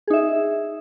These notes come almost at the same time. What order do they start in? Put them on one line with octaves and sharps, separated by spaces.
G#4 D#4 E5